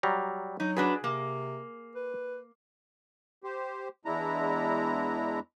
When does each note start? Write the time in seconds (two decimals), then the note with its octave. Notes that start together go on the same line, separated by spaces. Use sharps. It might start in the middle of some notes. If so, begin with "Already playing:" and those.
0.03 F#3 G3 A#5
0.60 F#3 D#4
0.77 D4 F#4 G#4 B4
1.04 C3 A#3
1.96 B4
3.43 G4 C5
4.05 E2 G#3 D4 E4 A#5